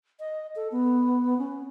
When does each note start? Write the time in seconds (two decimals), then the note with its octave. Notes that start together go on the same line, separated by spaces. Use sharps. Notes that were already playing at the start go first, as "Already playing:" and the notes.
0.20 D#5
0.56 A4
0.72 B3
1.38 C#4